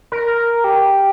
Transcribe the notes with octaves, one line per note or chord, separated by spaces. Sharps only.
A#4
G4